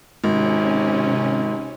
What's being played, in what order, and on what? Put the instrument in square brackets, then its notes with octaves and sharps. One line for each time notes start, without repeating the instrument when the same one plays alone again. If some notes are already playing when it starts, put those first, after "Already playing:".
[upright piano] G#1 [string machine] C3 C#4